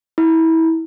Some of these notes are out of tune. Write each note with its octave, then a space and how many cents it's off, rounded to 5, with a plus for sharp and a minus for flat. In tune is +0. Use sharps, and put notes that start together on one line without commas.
E4 -25